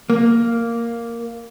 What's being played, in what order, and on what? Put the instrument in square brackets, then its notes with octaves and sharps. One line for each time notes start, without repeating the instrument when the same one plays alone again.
[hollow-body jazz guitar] A#3